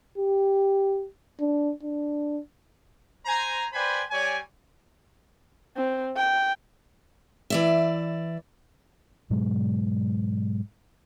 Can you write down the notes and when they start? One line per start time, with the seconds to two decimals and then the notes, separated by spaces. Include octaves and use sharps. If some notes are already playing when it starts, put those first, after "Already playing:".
0.18 G4
1.40 D4
1.83 D4
3.25 C5 G#5 A#5
3.73 B4 C5 D5 G5 G#5 B5
4.11 G3 C#5 D5 G#5
5.77 C4
6.17 G5
7.50 E3 D5 E5
9.30 G#2 B2 F#3 G#3